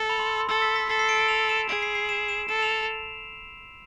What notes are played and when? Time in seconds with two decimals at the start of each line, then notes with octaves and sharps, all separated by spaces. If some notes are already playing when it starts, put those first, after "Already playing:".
Already playing: A4
0.09 B5
0.19 C6
0.29 E6
0.39 C6
0.49 A4 E6
0.62 B6
0.76 B6
0.89 A4 C7
0.99 C7
1.09 D7
1.19 D7
1.28 F7
1.49 E7
1.69 G#4 D7
1.83 C7
1.95 C7
2.09 E7
2.28 E7
2.48 A4 E7
2.63 F7